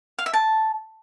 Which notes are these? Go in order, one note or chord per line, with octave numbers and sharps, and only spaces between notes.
F5
E5
A5